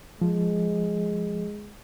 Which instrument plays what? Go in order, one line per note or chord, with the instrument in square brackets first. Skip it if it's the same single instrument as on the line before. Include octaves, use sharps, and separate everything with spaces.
[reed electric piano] F3 [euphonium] G#3